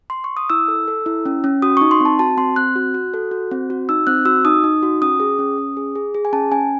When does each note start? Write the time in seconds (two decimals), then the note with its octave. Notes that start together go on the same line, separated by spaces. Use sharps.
0.10 C6
0.24 C#6
0.37 D#6
0.50 E4 E6
0.68 A4
0.88 A4
1.06 E4
1.26 C#4
1.44 C#4
1.62 F#4 D#6
1.77 D#4 C#6
1.91 C6
2.00 C4 A5
2.19 F#4 A5
2.37 C4 C6
2.56 C4 F#6
2.76 F#4
2.94 F#4
3.14 A4
3.31 F#4
3.51 C4
3.70 F#4
3.89 D#4 E6
4.07 C4 F#6
4.25 F#4 E6
4.45 D#4 D#6
4.64 D#4
4.83 F#4
5.02 C#4 D#6
5.20 G#4
5.39 C#4
5.58 C#4
5.77 G#4
5.95 G#4
6.14 G#4
6.25 G#5
6.33 C#4 A5
6.52 C#4 G#5